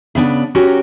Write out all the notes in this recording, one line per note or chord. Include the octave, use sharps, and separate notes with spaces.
C#3 B3 D4
C#4 F#4 G4 A#4